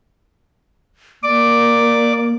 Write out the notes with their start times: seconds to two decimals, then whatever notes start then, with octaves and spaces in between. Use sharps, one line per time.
1.23 A#3 D5 D6